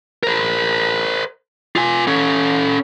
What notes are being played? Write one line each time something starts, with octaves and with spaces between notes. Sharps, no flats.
A#4 C5
F4 G#5
C#4 A4